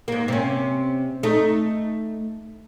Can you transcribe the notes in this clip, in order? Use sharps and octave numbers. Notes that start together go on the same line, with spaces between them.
G#2 A#3
C3 C#4
A3 D#4